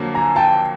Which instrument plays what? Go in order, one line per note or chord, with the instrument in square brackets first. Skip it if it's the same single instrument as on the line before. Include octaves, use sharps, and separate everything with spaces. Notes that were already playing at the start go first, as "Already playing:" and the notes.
Already playing: [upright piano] F2 D3 F#3 A#3
[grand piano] G#5 A#5
G5 A5